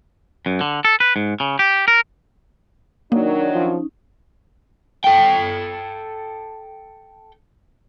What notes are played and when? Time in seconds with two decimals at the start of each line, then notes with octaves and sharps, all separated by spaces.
0.46 F#2
0.61 D3
0.85 A4
1.00 B4
1.16 G#2
1.40 C#3
1.59 G4
1.88 A#4
3.12 D#3 F#3 A#3 D4 D#4 A#4 D5
3.53 F3 C#4 D#4
5.04 A4 G5